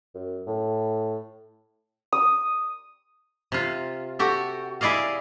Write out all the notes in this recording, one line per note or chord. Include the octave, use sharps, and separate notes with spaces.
F#2
A2
D#6
C3 F4
F#4 G4 A4
E4 G#4 D5 D#5 F5